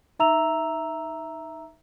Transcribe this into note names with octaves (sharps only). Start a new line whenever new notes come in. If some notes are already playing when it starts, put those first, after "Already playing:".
D#4 E5 A#5 E6 F7